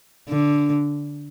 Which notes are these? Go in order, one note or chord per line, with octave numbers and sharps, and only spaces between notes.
D3